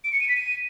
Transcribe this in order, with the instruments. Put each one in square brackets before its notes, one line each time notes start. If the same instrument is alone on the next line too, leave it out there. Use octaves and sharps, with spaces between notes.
[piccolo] D7
C#7
D#7
B6
D#7